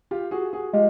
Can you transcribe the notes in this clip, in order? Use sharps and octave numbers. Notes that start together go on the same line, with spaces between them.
F4 G4
F#4 G#4
F#4 G#4
G#3 F4 G4